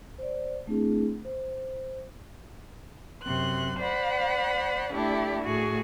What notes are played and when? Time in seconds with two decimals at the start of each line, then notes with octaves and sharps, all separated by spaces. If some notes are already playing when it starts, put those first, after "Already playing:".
0.18 C5 D5
0.67 A3 C4 D4 E4 G#4
1.25 C5
3.23 F#2 C3 C6 F#6
3.78 C5 D5 F#5 B5
4.91 A3 D4 E4 G4 A4 D5
5.42 A2 F#4 G#4